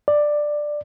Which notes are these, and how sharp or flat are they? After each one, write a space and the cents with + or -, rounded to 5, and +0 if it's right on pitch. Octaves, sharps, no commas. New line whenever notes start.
D5 +10